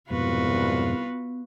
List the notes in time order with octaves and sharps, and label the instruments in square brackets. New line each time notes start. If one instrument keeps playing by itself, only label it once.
[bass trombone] C2 [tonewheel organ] F2 G#2 B2 [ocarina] B3 [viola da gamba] F4 F#4 B4